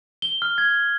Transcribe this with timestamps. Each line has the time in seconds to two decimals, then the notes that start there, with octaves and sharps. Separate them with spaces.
0.22 G7
0.42 F6
0.58 G#6